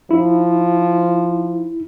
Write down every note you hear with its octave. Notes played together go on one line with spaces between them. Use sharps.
F3 D#4 E4